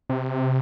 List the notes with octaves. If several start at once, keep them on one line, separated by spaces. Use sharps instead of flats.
C3